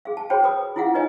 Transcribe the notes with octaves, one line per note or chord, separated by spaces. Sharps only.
G#4 F5
A5
F#4 G#4 C5 C#5 G5 B5
B4 B5 D#6
E4 F4 G#4 F5 F#5
D#4 B4 C#5 D#5 G#5